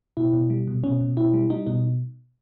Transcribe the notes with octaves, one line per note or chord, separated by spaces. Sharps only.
B2 E4
B2
G3
B2
B2 C#4
B2
B2 E4
G3
G3 D#4
B2 D#4